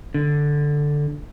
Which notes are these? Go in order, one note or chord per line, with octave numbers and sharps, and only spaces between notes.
D3